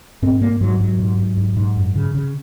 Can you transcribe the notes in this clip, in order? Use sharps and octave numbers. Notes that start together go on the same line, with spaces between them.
G#2 C4
G#2 A#3
G#2 F#3
G#2 F#3
G#2
G#2
G#2
G#2
F#2
C#3
C#3